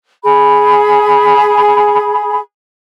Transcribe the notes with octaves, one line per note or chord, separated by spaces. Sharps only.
G#4 B5